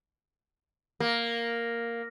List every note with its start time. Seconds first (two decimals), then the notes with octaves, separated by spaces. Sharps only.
1.00 A#3